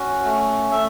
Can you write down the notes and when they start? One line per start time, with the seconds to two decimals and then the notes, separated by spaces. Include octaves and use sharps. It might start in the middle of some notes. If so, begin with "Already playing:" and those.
Already playing: C#4 F#4
0.25 A3
0.72 A3 E5